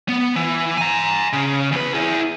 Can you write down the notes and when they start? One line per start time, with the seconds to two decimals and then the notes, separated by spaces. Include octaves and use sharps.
0.09 B3
0.36 E3
0.77 G#5 A#5
1.33 C#3
1.72 E2 B4
1.94 E4 G#4